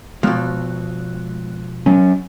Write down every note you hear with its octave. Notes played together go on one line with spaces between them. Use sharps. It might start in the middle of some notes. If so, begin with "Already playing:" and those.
B2 F3 G#3 B3 F#6
F#3 C#4